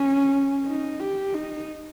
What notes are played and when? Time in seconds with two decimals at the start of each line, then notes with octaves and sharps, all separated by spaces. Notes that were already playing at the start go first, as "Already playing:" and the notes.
Already playing: C#4
0.66 D#4
1.00 G4
1.34 D#4